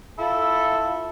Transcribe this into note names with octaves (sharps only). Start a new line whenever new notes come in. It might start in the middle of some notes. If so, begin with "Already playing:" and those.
E4 F4 A4